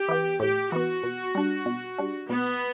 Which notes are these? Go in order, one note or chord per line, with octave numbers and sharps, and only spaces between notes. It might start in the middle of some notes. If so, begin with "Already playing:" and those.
Already playing: G4
E3 B3
A2 G4
E3 B3 F#4
B2
G3 D4
B2
G3 D4
B2 B3